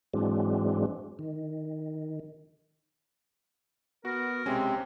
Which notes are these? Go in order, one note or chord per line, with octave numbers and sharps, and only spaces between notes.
G#2 E3 F#3 G#3 C4 D4
D#3
B3 F#4 A#4
B1 C3 G#3 C4 C#4